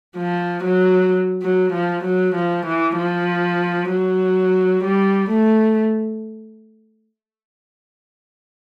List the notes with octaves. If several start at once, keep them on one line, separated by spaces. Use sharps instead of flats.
F3
F#3
F#3
F3
F#3
F3
E3
F3
F#3
G3
A3